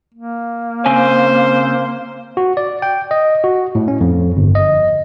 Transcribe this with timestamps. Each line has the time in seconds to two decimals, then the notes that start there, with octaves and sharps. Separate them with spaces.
0.14 A#3
0.86 C#3 C4 C5 G#5
2.37 F#4
2.57 D5
2.82 G5
3.11 D#5
3.44 F#4
3.75 A2
3.88 C#4
4.01 F2
4.37 G1
4.55 D#5